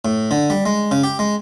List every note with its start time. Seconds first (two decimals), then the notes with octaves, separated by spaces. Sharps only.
0.05 A2
0.31 D3
0.50 G3
0.66 G#3
0.91 C#3
1.03 G4
1.19 G#3